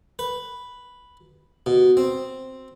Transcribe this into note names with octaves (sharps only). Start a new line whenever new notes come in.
B4
B2
C4